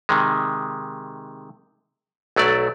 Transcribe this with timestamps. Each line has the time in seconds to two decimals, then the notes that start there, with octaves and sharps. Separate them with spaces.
0.09 C3 D#3 G#3
2.36 B1 F#3 A3 D5